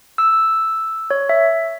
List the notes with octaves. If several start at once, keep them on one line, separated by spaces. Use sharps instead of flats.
E6
C#5
E5